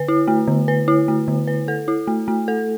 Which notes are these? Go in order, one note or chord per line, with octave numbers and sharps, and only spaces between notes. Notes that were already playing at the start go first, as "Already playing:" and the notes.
Already playing: D3 B4
E4
A3
D3
B4
E4
A3
D3
B4
A4
E4
A3
A3
A4